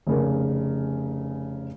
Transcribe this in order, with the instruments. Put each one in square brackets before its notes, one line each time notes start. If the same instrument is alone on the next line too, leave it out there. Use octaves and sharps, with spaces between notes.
[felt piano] F1 C#3 A#4